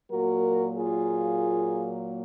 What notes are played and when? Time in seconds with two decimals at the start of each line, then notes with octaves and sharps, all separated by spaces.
0.10 A#2 F#3 A#3 F#4 A#4
0.76 F4 G#4